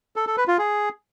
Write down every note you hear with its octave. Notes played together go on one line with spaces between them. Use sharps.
A4
A4
B4
F4
G#4